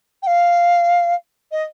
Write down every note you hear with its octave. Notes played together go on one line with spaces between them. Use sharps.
G5
F5
D#5